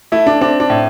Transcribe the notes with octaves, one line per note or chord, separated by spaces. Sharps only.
A3 E4
D4
C4 D4
D4
A2